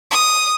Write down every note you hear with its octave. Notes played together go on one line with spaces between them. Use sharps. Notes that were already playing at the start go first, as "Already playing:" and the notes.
D#6